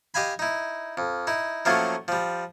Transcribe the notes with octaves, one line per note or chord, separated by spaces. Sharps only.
G4 D#5 F5 G#5 B5
D#4 E4
F2
D#4 E4
F3 F#3 A3 A#3 C#4 F4
F3 G3